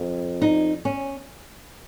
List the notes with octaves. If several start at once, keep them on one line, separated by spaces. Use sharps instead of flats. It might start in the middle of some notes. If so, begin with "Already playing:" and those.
Already playing: F2
D#4
C#4